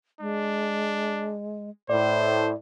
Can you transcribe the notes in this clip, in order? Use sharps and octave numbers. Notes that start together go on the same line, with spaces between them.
G#3 D4
A2 C5 D5